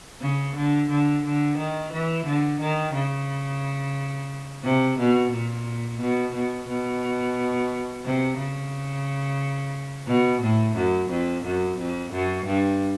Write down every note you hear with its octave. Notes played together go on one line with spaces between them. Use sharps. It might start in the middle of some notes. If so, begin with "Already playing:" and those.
C#3
D3
D3
D3
D#3
E3
D3
D#3
C#3
C3
B2
A#2
B2
B2
B2
C3
C#3
B2
A2
F#2
F2
F#2
F2
F#2
G2